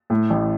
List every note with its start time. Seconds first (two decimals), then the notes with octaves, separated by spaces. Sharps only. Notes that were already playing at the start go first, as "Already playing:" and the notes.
0.10 A2
0.30 A1